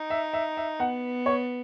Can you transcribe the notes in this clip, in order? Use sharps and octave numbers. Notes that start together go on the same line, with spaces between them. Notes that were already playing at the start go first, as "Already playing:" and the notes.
Already playing: D#4
E5
E5
E5
B3 F#5
C#5